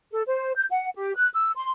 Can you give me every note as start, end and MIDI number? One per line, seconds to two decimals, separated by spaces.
0.12 0.23 69
0.27 0.53 72
0.55 0.64 91
0.71 0.89 78
0.94 1.14 67
1.16 1.28 90
1.33 1.51 88
1.56 1.72 84